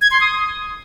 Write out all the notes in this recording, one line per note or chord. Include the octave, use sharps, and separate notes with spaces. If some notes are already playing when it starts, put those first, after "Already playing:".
G#6
C6
D#6